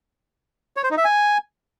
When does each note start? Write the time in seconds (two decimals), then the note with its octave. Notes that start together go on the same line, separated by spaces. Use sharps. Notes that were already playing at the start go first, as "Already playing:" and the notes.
0.77 C#5
0.84 C5
0.91 D#4
0.98 E5
1.05 G#5